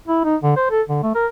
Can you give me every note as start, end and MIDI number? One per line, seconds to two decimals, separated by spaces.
0.08 0.21 64
0.24 0.36 63
0.43 0.52 50
0.56 0.67 72
0.71 0.82 69
0.89 1.00 50
1.03 1.11 57
1.15 1.27 70